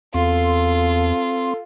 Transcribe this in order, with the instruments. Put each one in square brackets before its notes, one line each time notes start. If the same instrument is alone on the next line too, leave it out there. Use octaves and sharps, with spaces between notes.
[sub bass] E2 [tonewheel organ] C4 C6 [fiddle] F4 [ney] A4